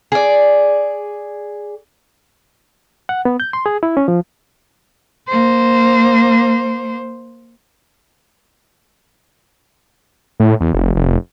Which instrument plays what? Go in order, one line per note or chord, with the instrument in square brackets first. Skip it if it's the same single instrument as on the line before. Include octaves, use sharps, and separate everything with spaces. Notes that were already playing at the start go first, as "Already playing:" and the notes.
[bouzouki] G#4 D5
[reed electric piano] F#5
B3
G6
C6
G#4
E4
C#4
F3
[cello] A#3 C5
[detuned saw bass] A2
E2
F1
F1